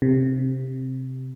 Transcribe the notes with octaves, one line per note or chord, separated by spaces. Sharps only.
C3